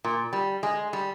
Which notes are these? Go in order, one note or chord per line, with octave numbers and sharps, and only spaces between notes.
A#2
G3
G#3
G3